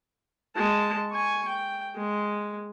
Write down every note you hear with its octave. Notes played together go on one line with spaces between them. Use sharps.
G#3 A5
G#5 C#6
G5
G#3